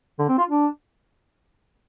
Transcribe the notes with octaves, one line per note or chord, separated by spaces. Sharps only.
D3
C4
F4
D4